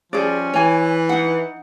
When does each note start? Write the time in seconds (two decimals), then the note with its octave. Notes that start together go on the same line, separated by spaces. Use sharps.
0.13 F3 G3 C#4 G#4 D5
0.54 E3 C#5 G#5
1.09 D#4 F#5